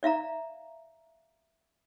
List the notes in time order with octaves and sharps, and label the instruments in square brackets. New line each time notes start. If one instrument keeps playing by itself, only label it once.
[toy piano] D5 E5 F5 A#5